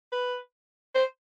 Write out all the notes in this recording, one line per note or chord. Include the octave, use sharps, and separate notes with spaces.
B4
C5